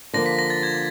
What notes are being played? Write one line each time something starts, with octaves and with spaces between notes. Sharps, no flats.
D3 F3 A#3 A#6
B6
A#6
A6
G#6